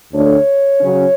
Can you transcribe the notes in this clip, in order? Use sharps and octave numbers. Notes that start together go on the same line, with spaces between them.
D2 D3 A3 D4 C#5
C#3 F#3 C#4